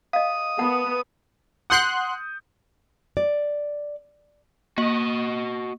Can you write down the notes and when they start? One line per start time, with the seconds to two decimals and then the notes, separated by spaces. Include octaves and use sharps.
0.13 D#5 F5 D#6
0.59 B3 A#4 F#5 A5
1.70 F#5 C6 D#6 F#6 G6 C#7
3.17 D5
4.78 A#3 F#4 D#5